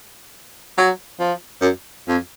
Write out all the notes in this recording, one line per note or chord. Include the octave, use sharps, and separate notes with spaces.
F#3
F3
F#2
F2